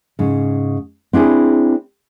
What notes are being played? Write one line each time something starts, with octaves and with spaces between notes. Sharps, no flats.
G#2 C#3
C4 D4 E4 G#4